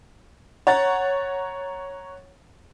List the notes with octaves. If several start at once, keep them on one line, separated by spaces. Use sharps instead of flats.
C#5 F#5 A#5 A6